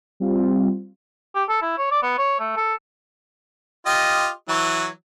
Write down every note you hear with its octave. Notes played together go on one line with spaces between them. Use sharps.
G3 C4 F4
G4
A4
E4
C#5
D5
B3
C#5
A3
A4
F4 G4 D#5
E3 F#3